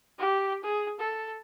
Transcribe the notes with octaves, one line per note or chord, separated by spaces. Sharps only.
G4
G#4
A4